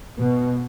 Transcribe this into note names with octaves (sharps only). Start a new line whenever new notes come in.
B2